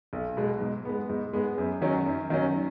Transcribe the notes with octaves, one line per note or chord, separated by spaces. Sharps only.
B1
B2 G#3
G#2
G#3 B3
G#2
G#3 B3
F#2
D#3 F#3 C#4
F#2
D#3 F#3 C#4